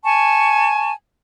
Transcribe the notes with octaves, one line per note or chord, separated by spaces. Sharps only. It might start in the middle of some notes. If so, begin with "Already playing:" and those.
G#5 A5 C#6